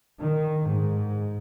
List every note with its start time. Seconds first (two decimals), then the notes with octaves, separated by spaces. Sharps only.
0.20 D#3
0.70 G#2